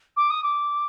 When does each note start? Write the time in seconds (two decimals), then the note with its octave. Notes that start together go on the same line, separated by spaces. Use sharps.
0.16 D6
0.30 D#6
0.43 D6